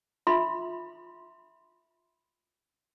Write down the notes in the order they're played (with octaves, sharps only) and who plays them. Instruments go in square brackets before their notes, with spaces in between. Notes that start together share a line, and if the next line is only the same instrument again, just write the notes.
[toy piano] F4 E5 B5 C6